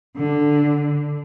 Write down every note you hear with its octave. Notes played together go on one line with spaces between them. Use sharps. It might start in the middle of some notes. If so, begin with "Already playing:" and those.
D3